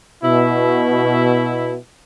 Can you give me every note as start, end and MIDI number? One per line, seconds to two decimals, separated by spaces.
0.23 1.75 47
0.23 1.75 64